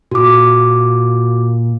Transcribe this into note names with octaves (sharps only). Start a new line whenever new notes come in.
A#2 F#4 D6